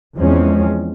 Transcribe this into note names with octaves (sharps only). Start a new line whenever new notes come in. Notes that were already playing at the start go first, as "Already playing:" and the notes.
E2 F3 G#3 C4 C#4